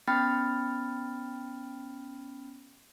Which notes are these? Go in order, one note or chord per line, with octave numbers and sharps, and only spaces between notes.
B3 C#4 G5 B5 F6 A6